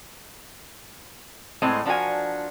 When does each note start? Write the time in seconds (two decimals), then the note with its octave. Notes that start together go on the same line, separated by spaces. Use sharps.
1.62 A2 G#3 C4 D#5
1.85 F3 D4 F#4 A#4 G#5